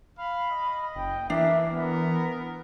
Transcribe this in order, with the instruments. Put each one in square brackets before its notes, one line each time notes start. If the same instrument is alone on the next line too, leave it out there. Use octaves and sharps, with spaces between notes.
[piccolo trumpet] F5 [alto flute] B5
[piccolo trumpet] D#5
[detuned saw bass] F#1 [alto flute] G5
[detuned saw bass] E3 [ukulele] D4 [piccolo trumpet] A#4 [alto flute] E5
[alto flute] B3 [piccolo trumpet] A#4